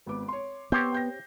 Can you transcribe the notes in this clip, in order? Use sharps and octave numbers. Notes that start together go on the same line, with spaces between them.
G#1 B3 D6
C#5 C6
B3 C4 G4 C#5 G6 C7
G5 G6 A#6